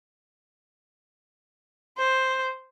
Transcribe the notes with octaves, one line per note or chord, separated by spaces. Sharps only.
C5